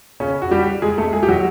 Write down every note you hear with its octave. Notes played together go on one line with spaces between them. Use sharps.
C#3 C#4
F#4
G3 G4
G#3 G#4
A3 A4
G#3 G#4
G4
F#3 F#4